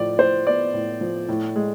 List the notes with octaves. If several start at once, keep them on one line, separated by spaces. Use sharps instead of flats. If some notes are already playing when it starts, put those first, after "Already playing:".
Already playing: A2 F3 D5
A2 C5
B3 D5
A2
F3
A2
G#3